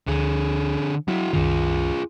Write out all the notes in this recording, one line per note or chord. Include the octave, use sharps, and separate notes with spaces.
D2 D3 G#4
F#3 E4 F#4
C2 F#2 D#3 F4 G#4